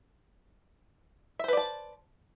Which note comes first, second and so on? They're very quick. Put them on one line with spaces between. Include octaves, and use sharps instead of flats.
E5 C5 B4 D5 A5